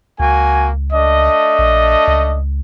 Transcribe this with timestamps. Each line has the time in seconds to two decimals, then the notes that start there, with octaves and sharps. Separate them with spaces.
0.20 C#2 A#3 F#4 G#5
0.93 A3 D4 D#5
1.59 A#1
2.08 C#2